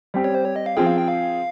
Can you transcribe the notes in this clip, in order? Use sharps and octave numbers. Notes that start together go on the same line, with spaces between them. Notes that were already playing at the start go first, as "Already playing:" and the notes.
G3 C4 G4
C#5
C5
C#5
D#5
F5
F3 C4 F4 G#4 G5
F5
G5
F5